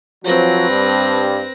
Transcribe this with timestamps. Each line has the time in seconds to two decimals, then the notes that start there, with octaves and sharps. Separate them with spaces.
0.24 F3 F#3 C4 B4 A#6
0.70 G2